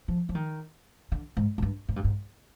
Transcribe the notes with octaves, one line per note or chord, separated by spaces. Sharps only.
F3
F3
D#3
D3
G#2
G#2
G2
G#2
G2
G#2